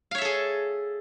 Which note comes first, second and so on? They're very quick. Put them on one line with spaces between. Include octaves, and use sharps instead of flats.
F5 C#5 E5 A4 G#4